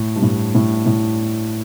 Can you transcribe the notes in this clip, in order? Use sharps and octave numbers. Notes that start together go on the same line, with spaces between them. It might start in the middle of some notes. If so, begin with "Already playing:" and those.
Already playing: A2
G2
A2
A2
A2